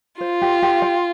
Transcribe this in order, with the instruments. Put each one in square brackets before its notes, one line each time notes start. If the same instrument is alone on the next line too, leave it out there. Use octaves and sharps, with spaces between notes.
[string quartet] F4 [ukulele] C5
[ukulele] G4
G4
G5